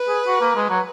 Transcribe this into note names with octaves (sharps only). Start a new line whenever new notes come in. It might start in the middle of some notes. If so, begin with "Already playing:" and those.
Already playing: B4
G#4
F#4
A#3
G#3
F#3